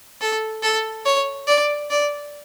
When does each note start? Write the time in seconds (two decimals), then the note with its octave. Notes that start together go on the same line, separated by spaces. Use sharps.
0.21 A4
0.63 A4
1.06 C#5
1.48 D5
1.90 D5